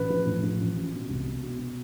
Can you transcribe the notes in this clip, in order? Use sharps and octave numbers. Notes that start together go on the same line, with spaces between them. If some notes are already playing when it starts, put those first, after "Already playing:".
Already playing: A1 B4
F3
A2
F3
A1
A1
B2
C2
B2
B2
B2